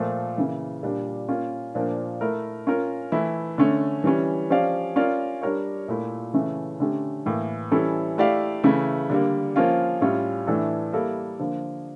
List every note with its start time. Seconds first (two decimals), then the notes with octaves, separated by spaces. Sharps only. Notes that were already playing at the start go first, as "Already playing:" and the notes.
Already playing: A#2 F3 A3
0.37 C#3 E3 A#3
0.83 A#2 G3 D4
1.28 A#3 C#4 F4
1.75 A#2 F3 A#3 D4
2.21 A3 E4 A#4
2.67 C#4 F4 A#4
3.12 E3 A3 E4
3.58 D3 A3 C#4
4.04 E3 G3 C#4
4.50 F3 C#4 G4 D5 F5
4.96 C#4 F4 A#4 D5 F5
5.42 G3 D4 G4 A#4 C#5
5.88 A#2 A3 E4
6.33 C#3 E3 A3 C#4
6.80 D3 A3 C#4 G4
7.26 A2 E3 A#3
7.71 E3 G3 C#4 E4 A4
8.18 A3 E4 G4 D5 F5
8.64 C#3 E3 A3 E4
9.10 D3 G3 A#3
9.56 F3 A#3 C#4 F4
10.01 A2 G3 C#4 F4
10.47 A2 E3 A3 D4 A4
10.93 G3 A#3 E4 A4
11.39 D3 F3 A#3